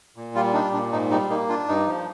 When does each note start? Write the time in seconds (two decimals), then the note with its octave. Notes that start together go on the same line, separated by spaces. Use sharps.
0.16 A#2
0.35 G3 F4
0.54 D4 D#4
0.73 A#2 D4
0.92 G#2 D#4
1.10 G3 D#4
1.30 A#3 D#4
1.49 D4 F4
1.68 G2 D#4
1.87 F3